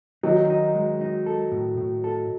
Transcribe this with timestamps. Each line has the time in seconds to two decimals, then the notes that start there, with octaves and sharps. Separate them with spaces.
0.23 D#3 F#3 D#4
0.50 D#4
0.75 G#3
1.01 D#4
1.26 A4
1.52 A2
1.77 A2
2.04 A4